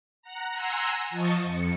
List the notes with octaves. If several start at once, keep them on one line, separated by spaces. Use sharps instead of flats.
F#5 A#5
F#5 G#5 A#5 C6 E6
F3 D#5 A5 C#6
F2 C#7